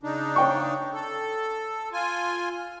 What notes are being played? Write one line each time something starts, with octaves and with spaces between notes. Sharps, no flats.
C#3 D4 D#4
C#5 G5 C#6
A4
F4 G#5